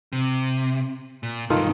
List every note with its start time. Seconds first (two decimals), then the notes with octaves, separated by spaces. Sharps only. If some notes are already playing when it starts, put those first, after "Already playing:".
0.13 C3
1.23 A#2
1.50 C#2 G2 D#3 D#4 F4 A4